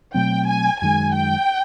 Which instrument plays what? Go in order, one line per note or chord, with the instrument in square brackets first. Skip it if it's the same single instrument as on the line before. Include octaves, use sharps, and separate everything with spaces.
[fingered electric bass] B2 F#3 A3 C4 [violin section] G5
[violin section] G#5
[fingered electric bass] F#2 D#3 G#3 [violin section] G#5
[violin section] G5